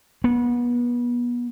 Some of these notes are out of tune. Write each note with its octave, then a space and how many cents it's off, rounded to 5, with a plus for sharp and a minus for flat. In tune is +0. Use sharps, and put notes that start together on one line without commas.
B3 -30